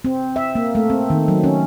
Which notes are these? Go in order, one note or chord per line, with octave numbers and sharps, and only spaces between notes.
C4
E5
A#3
A3
C4
D#3
F#3
C#4